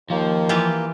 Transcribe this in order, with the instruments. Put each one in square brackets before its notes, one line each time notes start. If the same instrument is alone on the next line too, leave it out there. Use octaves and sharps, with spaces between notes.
[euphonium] D#2 [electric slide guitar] F3 [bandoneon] A#3
[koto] E3 F4 G4